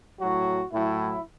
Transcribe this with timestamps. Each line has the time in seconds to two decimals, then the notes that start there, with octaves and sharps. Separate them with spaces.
0.19 A2 F#3 F#4
0.73 A2 F#3 E4